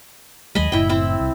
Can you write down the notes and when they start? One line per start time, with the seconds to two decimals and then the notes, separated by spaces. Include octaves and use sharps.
0.55 D#2 F#3 G#3 D#5 G#5 B5
0.72 F#1 A2 E4 G5
0.89 C4 E4
1.20 C2